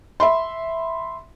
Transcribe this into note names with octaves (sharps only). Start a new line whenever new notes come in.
E5 B5 C6